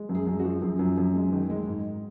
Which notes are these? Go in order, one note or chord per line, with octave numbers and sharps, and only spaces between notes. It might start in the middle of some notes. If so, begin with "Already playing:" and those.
Already playing: G#3
F#2
G#4
F#2
F#4
F3
F#2 G#4
F#2
F#2
G#3
D#3
G#3
G#2